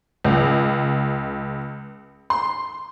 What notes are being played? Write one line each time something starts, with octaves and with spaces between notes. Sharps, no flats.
C#2
C6